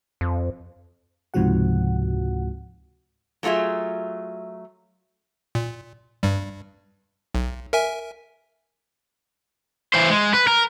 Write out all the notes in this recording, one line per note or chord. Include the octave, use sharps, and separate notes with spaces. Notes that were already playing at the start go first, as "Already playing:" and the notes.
F2
C#2 G#2 C3 F3 F#4 F#5
F#3 A3 F4 G#4 E5
A#2
G2 G3
B1
A#4 E5 G#5
E3 C5
G#3
B4
A#4